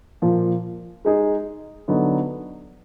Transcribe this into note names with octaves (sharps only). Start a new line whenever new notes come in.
A#2 F3 A#3
G#3 D#4 G#4
D3 F#3 B3 D#4